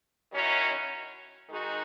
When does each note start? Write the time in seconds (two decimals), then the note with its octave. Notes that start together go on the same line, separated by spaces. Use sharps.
0.32 D#3 F#3 C#4 E4
1.49 D#3 G#3 D#4 F#4